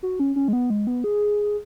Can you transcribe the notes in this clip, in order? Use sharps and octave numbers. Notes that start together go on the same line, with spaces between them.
F#4
C#4
C#4
G#3
B3
G#3
B3
G#4